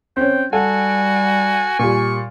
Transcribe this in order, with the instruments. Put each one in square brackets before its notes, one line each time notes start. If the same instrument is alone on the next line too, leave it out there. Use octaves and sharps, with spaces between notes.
[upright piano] C4 C#4 [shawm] G5
[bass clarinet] G3 [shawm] F#4 [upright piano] A4 F#5 [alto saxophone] G#5
[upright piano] A#2 G3 [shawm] C#6